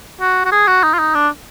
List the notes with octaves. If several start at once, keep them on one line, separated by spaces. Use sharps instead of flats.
F#4
F#4
G#4
F#4
D#4
F4
D#4
D4